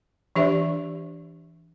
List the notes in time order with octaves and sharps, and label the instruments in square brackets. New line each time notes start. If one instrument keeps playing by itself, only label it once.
[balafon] E3 D4 G4 C5 E5